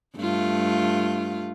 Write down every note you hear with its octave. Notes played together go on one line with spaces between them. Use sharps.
G2 A3 F4